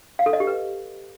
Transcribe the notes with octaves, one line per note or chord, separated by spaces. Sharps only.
F5
A4
D#5
G4
B4